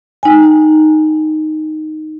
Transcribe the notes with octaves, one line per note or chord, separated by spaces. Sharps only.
D#4 G5 G#5